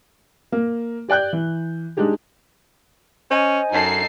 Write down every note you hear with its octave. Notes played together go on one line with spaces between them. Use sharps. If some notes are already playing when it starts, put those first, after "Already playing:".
A#3 A#4
G4 D5 G5 F#6 G6
E3
G#3 D4 D#4 G4 G#4
C#4 C5 D#5 G#5
F#2 D#4 A4 C7